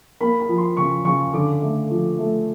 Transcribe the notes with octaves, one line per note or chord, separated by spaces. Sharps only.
A#3 B5
B5
F3
C6
C#3 C#6
C#3 C#6
D3 D6
A3
F3
A3